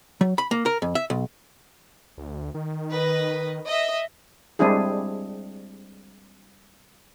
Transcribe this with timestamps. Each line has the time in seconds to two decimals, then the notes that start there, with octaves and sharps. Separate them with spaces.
0.21 F#3
0.38 B5
0.51 A#3
0.66 A#4
0.82 F2
0.95 E5
1.10 B1
2.18 D2
2.54 D#3
2.92 B4 D#5
3.66 D#5 E5
4.59 G3 G#3 C4 D4 E4 G#4